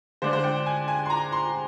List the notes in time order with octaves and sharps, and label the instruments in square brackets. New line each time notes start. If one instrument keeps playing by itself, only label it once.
[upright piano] D3 G#3 D4 C5
C5
G5
G#5
G#5
C6
A#5
C6